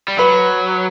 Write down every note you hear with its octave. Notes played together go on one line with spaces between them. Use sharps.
G3
F#3 B4